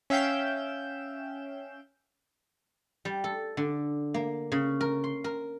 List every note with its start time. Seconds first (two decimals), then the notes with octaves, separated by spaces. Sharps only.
0.10 C#4 E5 F5 G5 G6 E7
3.05 G3
3.24 A4
3.57 D3
4.14 A#3
4.52 C#3
4.81 A#4
5.04 C6
5.24 A#4